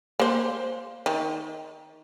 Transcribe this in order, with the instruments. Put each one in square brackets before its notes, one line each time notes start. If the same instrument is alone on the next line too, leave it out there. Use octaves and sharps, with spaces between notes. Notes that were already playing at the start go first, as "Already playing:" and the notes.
[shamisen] A#3 C5
D#3